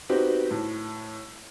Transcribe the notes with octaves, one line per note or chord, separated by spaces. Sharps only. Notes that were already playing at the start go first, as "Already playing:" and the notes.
B3 C4 D#4 F#4 G4
A2